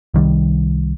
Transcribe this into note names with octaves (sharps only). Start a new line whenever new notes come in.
C2 D#3 G3